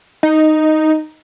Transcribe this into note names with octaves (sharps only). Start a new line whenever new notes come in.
D#4